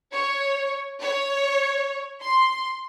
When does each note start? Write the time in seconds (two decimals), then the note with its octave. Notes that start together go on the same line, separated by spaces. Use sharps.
0.13 C#5
1.02 C#5
2.22 C6